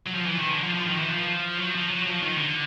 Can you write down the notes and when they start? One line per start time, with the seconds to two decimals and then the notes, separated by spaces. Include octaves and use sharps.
0.07 F#3
0.15 F3
0.26 E3
0.39 D#3
0.51 D3
0.62 F3
0.74 F3
0.87 D#3
0.98 E3
1.11 F3
1.59 F#3
1.75 F3
1.91 F#3
2.07 F3
2.22 D#3
2.38 D3